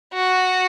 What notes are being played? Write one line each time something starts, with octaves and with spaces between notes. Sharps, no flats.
F#4